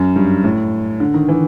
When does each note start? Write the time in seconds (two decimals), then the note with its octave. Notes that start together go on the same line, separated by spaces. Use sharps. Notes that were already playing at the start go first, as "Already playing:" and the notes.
Already playing: F#2
0.16 G2
0.44 A2
1.00 D3
1.14 D#3
1.28 E3